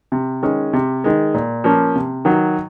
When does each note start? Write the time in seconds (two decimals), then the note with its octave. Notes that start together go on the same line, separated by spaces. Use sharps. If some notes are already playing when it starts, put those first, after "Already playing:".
0.12 C3
0.43 D#3 G#3 C#4
0.73 C3
1.04 D#3 G#3
1.34 A#2
1.64 F3 A#3 C#4
1.96 C3
2.25 D#3 F#3